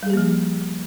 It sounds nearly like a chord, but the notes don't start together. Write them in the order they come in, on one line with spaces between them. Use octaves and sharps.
G3 G#4 G4 A#3 F3